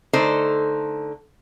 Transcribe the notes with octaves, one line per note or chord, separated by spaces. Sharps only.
D3 A3 D#4 A4 C5